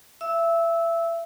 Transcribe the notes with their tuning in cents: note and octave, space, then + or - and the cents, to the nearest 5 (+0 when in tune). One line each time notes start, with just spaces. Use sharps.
E5 +30 E6 -15